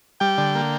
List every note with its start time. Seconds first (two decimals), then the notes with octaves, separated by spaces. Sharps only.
0.20 G3 G5
0.38 D3
0.55 A#3